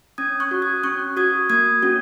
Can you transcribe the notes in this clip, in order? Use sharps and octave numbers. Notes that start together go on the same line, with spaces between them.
C#4 D#6 G#6
C#6 F#6
F#4
D#6 G#6
C#4 C#6 F#6
F#4 D#6 G#6
A#3 D#6 G#6
C#4 F#4